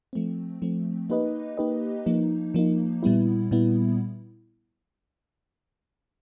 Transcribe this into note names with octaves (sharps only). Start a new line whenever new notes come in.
F3 A3 C4
F3 A3 C4
A#3 D#4 G4 B4 D#5
A#3 D#4 G4 B4 D#5
F3 A#3 D#4
F3 A#3 D#4
A#2 G3 B3 E4
A#2 G3 B3 E4